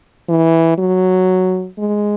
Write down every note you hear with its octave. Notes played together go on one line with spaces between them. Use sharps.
E3
F#3
G#3